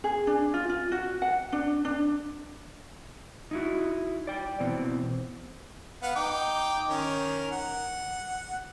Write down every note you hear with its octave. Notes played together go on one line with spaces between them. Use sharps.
G#4
D4
F4
F4
F#4
F#5
D4
D4
D#4 E4 F#4
D5 G5
B2 E3 C4
B3 F5 F#5
D#4 G5 D6
D#3 C#4 A#4
F#5